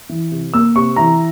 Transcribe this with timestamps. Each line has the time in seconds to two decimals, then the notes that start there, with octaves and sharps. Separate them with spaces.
0.09 E3
0.31 C3
0.54 A#3 E6
0.75 C3 C#6
0.96 E3 A#5